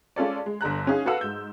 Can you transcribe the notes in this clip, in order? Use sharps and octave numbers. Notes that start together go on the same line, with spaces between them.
G#3 C#4 F4 A4 D5
G#3
G1 D3 A#5 F#6
C#4 D#4 G#4 F5
F#4 A4 B4 F5 F#5 E6
G#2 G6